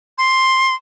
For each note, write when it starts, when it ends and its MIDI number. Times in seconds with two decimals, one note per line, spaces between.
0.18 0.74 84